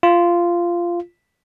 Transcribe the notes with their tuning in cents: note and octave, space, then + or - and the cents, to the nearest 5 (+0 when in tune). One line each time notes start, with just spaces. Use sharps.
F4 -10